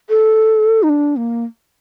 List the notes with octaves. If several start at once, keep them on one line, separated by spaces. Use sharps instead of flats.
A4
D#4
D4
A#3